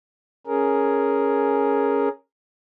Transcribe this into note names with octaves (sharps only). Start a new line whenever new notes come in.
C#4 G#4 A#4